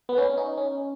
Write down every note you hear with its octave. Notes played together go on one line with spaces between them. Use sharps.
B3
C#4
C#4
D#4
C#4